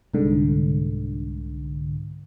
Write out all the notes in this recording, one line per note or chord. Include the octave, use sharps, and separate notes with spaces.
C2 G#2 D3